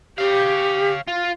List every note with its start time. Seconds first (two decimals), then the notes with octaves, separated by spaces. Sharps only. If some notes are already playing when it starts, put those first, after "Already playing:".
0.18 G4 C#5 F5
1.08 F4